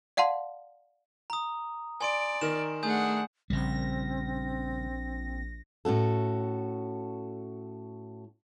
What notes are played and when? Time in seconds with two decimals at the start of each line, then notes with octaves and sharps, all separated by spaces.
0.17 D5 F5 F#5 A5 C6
1.30 A#5 D#6
2.01 D5 G#5 C6 D7
2.41 D#3 A#4 E7
2.83 A3 D4 G#4 F#5 G#5 D#6 G6
3.50 A#1 C#3 G3 C4 A#6
5.85 A2 C#4 F#4 A4